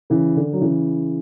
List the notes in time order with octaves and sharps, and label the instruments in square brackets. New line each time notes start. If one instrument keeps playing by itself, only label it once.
[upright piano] C#3 E3
D3
F#3
C#3 E3